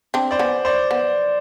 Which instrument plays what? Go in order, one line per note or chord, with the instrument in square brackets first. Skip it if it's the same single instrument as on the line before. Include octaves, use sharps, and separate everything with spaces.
[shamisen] C4 D4
[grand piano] C5 D5
[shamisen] B3 C#4
[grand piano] C5 D5
[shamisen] B3